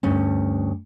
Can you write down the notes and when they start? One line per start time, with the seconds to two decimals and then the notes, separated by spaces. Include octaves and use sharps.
0.03 D2 G2 C#4